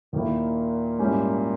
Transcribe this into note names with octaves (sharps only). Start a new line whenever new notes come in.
D#2 A#2 D#3 A#3 E4
G#2 G3 C#4 E4 G4